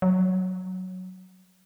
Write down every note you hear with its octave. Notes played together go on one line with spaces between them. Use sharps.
F#3